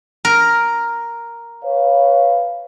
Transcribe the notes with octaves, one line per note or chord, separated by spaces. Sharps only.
A#4
B4 C#5 F5